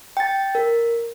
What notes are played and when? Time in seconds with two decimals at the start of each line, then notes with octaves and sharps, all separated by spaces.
0.17 G5 A6
0.55 A#4